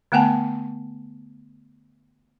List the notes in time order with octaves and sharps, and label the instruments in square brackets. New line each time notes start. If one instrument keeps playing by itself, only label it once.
[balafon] D3 A3 B3 F#5 G#5 A5